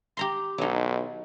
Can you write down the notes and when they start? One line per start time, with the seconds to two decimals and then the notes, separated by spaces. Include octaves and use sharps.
0.17 G4 A#5 C6
0.58 B1 F#3 D#4